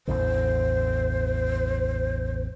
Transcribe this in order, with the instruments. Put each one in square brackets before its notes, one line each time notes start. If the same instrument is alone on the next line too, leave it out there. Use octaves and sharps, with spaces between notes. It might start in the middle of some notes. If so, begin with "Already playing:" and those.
[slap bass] A1 E2 D3 [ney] C5